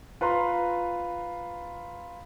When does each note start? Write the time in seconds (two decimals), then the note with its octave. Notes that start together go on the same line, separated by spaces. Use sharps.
0.21 F4 B4 A#5 C6